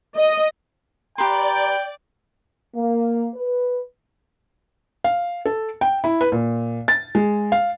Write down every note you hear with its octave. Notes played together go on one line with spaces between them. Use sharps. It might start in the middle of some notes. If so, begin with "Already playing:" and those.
D#5
G4 B4 D5 G5 A#5 C6
A#3
B4
F5
A4
G5
E4
B4
A#2
A6
G#3
F5